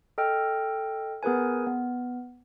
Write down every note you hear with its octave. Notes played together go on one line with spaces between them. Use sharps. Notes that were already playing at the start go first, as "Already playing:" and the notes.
A4 D#5 G5 F6
B3 G#4 A#4 B4 G#5
B3